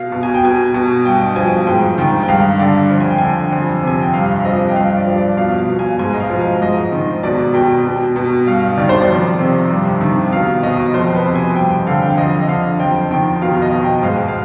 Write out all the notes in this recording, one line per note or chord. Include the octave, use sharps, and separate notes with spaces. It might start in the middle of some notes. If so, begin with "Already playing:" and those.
Already playing: B2 F5
B2
G#5
G5
B2 G#5
B2
G2 G5
F3 G#5
G#2 G5
D#3 G5
G5
G2 F5
D3 D5
F2
G#5
G5
D3 G#5
F2
C3 G#5
G5
G2 F5
F5
F3 D#5
G5
G2 F5
D5
F3
D5
B2 F5
F5
B2
G#5
G#2 G#5
D#5
F5
F3
F5
G#2 D#5
D#3
B2 D5
B2 G5
B2
B2
G2 F5
D#3 D5
C5
D5
F2
C3
G2
D#3
B2 F5
B2 D#5
F2 C5
B4
C3
G#5
G2 G5
D3 F5
G5
F5
F2 D#5
D#5
D3 F5
F2 G5
D#3 G5
B2 F5
D#5
B2
G5
G#2 F5
F5